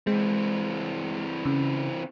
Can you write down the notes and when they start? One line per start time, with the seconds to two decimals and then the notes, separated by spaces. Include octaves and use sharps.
0.07 E3 G#3 C4
1.45 C#3